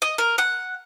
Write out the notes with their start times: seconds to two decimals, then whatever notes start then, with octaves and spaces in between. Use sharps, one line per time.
0.02 D#5
0.18 A#4
0.38 F#5